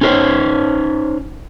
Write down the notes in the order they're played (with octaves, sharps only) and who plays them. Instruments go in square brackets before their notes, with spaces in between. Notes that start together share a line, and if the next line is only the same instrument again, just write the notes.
[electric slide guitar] C#4 D#4 G4 A#4 C5 C#5